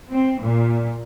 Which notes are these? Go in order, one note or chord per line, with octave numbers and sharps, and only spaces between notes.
C4
A#2